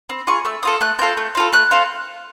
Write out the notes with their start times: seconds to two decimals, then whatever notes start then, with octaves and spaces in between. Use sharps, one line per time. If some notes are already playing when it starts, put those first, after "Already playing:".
0.09 C4
0.27 F4 G#4 C#6
0.45 A3 E6
0.63 C4 F4 A4 D#6
0.81 A3 F#6
0.99 C4 F4 A4 G6
1.17 A3
1.35 C4 F4 A4
1.53 A3 F#6
1.71 C4 F4 A4